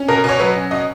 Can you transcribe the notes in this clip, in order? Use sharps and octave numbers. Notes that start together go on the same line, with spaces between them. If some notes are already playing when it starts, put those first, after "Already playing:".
Already playing: C#4
B2 A#4
B2
C#5
F#3 B4
C#4
B2 D#5